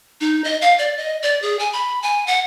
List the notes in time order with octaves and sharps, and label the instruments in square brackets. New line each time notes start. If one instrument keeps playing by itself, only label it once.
[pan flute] D#4
D#5
F5
D5
D#5
D5
G#4
G#5
B5
G#5
F#5